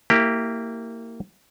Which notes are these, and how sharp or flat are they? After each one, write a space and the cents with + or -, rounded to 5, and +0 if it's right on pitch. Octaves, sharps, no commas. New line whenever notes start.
A#3 -20 E4 +0 G4 +0